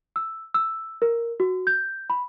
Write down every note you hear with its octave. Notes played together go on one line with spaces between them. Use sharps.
E6
E6
A#4
F#4
G6
B5